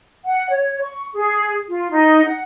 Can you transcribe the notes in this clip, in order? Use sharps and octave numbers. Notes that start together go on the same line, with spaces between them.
F#5
C#5
C#6
G#4
F4
D#4
F#5